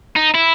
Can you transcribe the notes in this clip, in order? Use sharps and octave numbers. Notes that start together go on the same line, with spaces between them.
D#4
E4